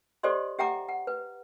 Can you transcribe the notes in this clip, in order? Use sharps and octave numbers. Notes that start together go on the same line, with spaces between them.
G4 A4 C5 D5 D#5 C6
G4 E5 F#5 G5 A#5 D6
F#5
B4